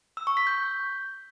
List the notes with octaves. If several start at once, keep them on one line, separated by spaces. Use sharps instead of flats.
E6
C#6
B6
G6